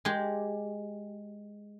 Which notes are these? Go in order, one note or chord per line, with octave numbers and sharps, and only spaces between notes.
G#3 G4